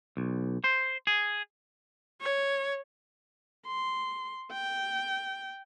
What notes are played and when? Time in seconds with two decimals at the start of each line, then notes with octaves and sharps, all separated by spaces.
0.17 B1
0.64 C5
1.07 G#4
2.21 C#5
3.67 C6
4.52 G5